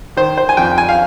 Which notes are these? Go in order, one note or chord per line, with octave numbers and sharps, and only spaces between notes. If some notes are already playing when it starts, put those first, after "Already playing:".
D#3 C5
C5
G#5
F2 G5
G#5
F5